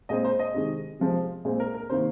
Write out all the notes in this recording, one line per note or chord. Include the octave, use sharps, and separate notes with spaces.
A#2 G#3 C4 D#5
C5
D#5
C3 D#3 G#3
C3 F3 G#3 C4
A#2 G#3 C4
A#4
A#4
C3 D#3 A#3 C5